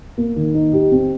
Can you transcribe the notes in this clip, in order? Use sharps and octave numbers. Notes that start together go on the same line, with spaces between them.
A#3
D#3
D#4
G4
C4